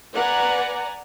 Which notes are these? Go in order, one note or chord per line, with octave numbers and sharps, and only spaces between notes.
B4 D5 F#5 G#5 A#5